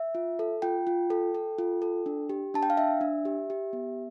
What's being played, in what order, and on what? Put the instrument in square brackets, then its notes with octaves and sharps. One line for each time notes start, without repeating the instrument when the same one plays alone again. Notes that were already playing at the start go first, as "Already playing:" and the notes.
Already playing: [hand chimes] E5
F4
A4
F4 G5
F4
A4
A4
F4
A4
D4
G4
D4 A5
G5
F5
D4 E5
D4
G4
G4
B3